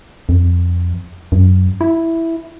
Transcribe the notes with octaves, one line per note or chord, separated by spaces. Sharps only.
F2
F#2
E4